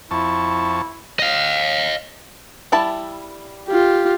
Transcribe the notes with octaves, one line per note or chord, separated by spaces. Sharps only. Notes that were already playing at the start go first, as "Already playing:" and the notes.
F2 E4 A5 C#6
D#5 F5
G3 E4 A5
F4 G4